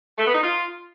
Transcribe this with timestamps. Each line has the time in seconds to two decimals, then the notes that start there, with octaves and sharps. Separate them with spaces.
0.18 A3
0.26 B3
0.35 D#4
0.43 F4